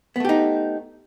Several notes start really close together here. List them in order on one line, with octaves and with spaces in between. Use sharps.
B3 A3 G4 D#4